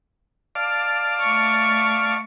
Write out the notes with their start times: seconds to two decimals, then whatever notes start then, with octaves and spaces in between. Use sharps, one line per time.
0.55 D5 F5 A5
1.21 A3 C#6